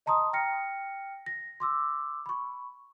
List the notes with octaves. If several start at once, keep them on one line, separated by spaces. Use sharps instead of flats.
D#5 A5 A#5 C6 D#6
G5 F6 A#6 C#7
A#6
C6 D6 E6
B5 C#6